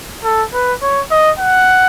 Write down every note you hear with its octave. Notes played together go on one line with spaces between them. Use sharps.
A4
B4
C#5
D#5
F#5